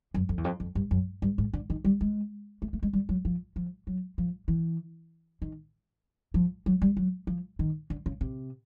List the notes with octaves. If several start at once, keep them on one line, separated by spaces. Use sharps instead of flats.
F#2
F2
E2
F2
F2
G2
F#2
G2
G#2
D3
D#3
G3
G#3
A3
A3
G#3
G3
F#3
F3
F3
F#3
F3
E3
D#3
F3
F#3
G3
F#3
F3
D#3
D3
C#3
C3